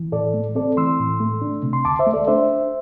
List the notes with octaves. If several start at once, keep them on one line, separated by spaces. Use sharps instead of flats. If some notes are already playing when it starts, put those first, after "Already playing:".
Already playing: E3
A2 A4 D5
A3
C4 A4 D5
E3 C6 E6
A2
A3
D4
C3
C6
D2 A5 D6
C5 E5
A3
A4 D5
D4 C5 E5